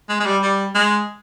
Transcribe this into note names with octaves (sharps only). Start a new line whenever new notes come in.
G#3
G#3
G3
G3
G#3